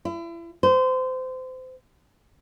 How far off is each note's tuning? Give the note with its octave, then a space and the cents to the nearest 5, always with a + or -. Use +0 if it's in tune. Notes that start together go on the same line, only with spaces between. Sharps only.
E4 +35
C5 -30